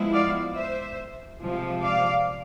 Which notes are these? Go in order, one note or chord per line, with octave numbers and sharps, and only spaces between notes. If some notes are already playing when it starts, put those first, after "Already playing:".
Already playing: F3 G#3 B3 E4
D5 F5
C5 E5
C3 F3 G#3
D5 F5